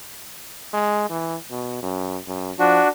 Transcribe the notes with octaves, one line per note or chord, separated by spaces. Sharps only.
G#3
E3
B2
F#2
F#2
F3 D4 F#4